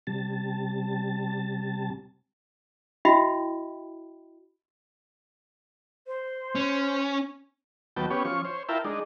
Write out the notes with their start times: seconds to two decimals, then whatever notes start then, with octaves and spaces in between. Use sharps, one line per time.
0.07 C3 G3 A5
3.05 E4 F#4 D#5 E5 G5 B5
6.07 C5
6.55 C#4
7.97 D#2 F#3 B3 G5 A5
8.10 B3 C#4 G4 C#5
8.25 F3 C#4 C#6
8.45 C5 C#5
8.69 E4 F4 A#4 E5 G5 A5
8.84 G#3 D4 D#4